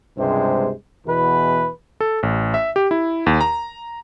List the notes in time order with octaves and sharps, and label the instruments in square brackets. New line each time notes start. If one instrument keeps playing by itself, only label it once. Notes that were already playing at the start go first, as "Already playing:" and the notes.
[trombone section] C#2 G2 C3 G#3 C5
E2 B2 E3 B4
[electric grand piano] A4
A1
E5
G4
E4
D#2
A#5